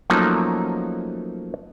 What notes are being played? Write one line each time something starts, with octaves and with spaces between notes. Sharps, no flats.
F3 F#3 A3 A#3 C#4 D#4